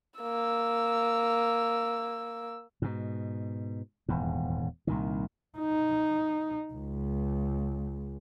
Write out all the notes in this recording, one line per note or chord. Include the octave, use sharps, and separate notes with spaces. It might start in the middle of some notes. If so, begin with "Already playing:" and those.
A#3 E6
G#2 B2
D#1 E2 G#2
C2 A#2 D#3
D#4
C#2